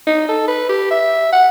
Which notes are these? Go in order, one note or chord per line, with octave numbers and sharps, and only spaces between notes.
D#4
A4
B4
G4
E5
F#5